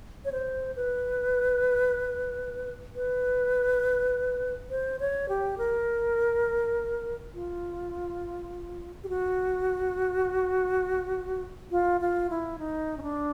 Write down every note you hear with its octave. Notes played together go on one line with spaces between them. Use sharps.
C#5
C5
B4
B4
C5
C#5
G4
A#4
F4
G4
F#4
F4
F4
E4
D#4
C#4
D4